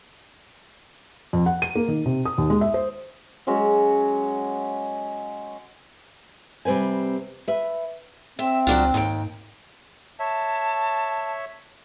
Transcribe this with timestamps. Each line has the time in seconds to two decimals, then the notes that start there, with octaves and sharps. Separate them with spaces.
1.33 F2
1.46 F#5
1.62 D#7
1.76 A#3
1.88 D#3
2.06 C3
2.25 D#6
2.38 D#2
2.50 G#3
2.61 E5
2.74 C5
3.47 F#3 G#3 C#4 F#4
6.65 C3 G3 C4 B4 G#5
7.48 B4 E5
8.39 C4 E5
8.67 C#2 F#3 D4 F4
8.94 D#2 G#2 G5
10.19 C#5 E5 A5